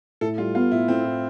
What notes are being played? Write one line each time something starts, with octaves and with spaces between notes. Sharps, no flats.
A2 A4
G3 F4
B3 F4
A2 E4
A2 C4
A2